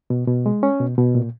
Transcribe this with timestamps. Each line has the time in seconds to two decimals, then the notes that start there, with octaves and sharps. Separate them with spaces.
0.10 B2
0.28 B2
0.46 G#3
0.63 C#4
0.80 B2
0.98 B2
1.15 A#2